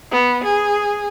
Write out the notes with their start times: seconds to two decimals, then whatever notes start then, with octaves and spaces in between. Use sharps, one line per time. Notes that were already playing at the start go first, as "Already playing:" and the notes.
0.11 B3
0.44 G#4